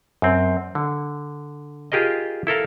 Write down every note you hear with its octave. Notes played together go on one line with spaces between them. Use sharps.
F#2 C4
D3
F4 G4 G#4 A#4 D#5
E4 A4 A#4 F5